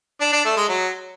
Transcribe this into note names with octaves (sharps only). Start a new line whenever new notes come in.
D4
D4
A3
G#3
F#3